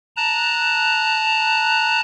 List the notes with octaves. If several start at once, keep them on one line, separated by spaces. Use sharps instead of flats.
A5 A#5 F#6